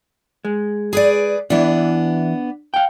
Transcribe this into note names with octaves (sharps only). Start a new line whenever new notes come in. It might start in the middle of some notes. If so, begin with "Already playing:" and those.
G#3
G#4 B4 D5
E3 B3 D4 E4
F5 G5